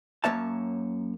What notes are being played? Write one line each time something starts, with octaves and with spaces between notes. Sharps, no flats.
F#2 A#3 C#5 E5 A5